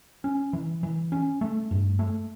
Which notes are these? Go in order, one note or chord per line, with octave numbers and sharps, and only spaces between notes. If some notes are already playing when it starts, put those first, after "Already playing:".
C#4
E3
E3
C#4
A3
G2
A3